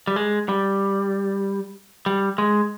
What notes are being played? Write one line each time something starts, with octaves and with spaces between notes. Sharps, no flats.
G3
G#3
G3
G3
G#3